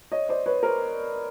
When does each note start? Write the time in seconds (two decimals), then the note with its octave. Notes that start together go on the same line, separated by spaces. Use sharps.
0.12 C#5 D#5
0.29 C5 D5
0.46 B4 C#5
0.63 A#4 C5